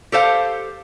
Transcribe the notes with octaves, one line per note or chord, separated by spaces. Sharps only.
G4 A4 C5 F5